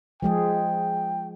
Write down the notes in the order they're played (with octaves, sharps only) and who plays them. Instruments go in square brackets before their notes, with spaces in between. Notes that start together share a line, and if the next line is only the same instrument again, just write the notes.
[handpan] F3 G#3 G#4 [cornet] G5